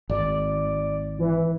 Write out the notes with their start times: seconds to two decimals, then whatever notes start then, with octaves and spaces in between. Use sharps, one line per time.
0.10 G#1 D5
1.19 E3